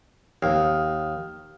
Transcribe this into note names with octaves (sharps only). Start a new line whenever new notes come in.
D#2